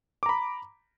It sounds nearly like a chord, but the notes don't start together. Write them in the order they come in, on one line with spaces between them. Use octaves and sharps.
D6 A#5 B5